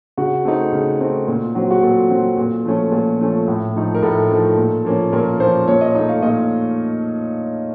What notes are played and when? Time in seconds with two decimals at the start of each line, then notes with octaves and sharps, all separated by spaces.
0.17 C#3 F#4
0.45 A3 C4 D#4
0.72 C#3
1.00 A3 C4 D#4
1.28 A#2
1.55 F#3 C4
1.71 F#4
1.82 A#2 A4
2.10 F#3 C4
2.38 A#2
2.65 F3 A3 C#4
2.92 A#2
3.20 F3 A3 C#4
3.47 A2
3.75 F3 A3 D#4
3.95 A#4
4.02 A2 A4
4.30 F3 A3 D#4
4.57 A#2
4.85 F3 A#3 C#4
5.12 A#2 A#4
5.40 F3 A#3 C#4 C5
5.68 A#2 C#5
5.81 D#5
5.95 A3 D#4 D#5
6.09 F5
6.22 A#2 D#5